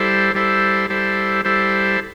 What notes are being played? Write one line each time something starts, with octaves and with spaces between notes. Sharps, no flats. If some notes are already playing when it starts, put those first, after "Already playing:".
Already playing: G3 E4 A4 C5
G3 E4 A4 C5
G3 E4 A4 C5
G3 E4 A4 C5